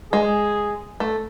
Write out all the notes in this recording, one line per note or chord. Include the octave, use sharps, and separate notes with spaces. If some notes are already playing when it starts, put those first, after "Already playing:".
G#3 G#4
A3